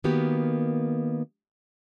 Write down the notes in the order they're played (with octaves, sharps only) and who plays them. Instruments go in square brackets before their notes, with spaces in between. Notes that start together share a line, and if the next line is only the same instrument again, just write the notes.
[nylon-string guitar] D#3 A#3 B3 F#4 G4